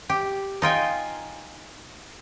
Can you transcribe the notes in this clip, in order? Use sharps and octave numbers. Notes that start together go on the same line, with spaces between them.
G4
D#4 F4 G5 G#5